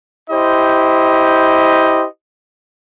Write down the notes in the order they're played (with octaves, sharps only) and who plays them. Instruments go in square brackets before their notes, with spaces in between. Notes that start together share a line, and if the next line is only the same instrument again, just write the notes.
[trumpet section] E4 G4 C5 D#5